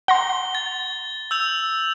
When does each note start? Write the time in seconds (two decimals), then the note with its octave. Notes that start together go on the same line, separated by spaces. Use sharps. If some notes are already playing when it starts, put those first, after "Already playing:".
0.08 F#5 A#5 C6 G7
0.55 A6
1.31 E6 G6 F7